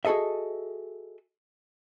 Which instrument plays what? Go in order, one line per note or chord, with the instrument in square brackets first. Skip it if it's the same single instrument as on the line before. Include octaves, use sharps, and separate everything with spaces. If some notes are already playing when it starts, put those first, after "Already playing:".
[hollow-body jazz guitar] F#4 G#4 A4 D#5 E5